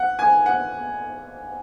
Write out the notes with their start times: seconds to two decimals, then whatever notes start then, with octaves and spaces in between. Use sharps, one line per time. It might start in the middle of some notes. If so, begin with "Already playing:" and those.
Already playing: F#5
0.19 G#5
0.46 F#5